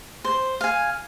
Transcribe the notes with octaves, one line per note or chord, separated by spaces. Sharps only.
C5
F5 G#5